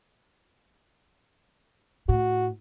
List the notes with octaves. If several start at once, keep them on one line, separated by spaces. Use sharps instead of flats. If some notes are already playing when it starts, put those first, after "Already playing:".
A2 F#4